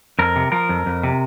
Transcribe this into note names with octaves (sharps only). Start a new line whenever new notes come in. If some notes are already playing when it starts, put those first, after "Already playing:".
F2 A#4
C3
F3 A#4
F2
F2
C3